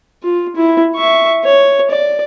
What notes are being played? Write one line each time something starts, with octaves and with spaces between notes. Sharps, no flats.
F4
E4
E5 C#6
C#5
D5